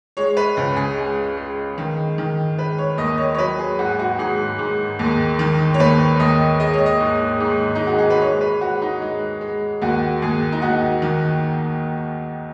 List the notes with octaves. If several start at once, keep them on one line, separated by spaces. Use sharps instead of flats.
G#3 C#5
B4
C#2
G#4
G#3
G#3
D#3
D#3
G#3 B4
C#5
D#2 D#5
C#5
C#5
F#3 B4
G#4
G#2 F#4
F#4
G#2 G#4
G#2
D#2
D#3
C#5
D#2 B4
D#2 D#5
G#3 D#5
C#5
D#5
G#2
G#2
G#3 D#4
F#4
G#4
B4
G#3 C#5
B4
G#3 F#4
D#4
G#3
G#3
D#2 F#4
D#2 G#4
D#4
D#2 F#4
D#3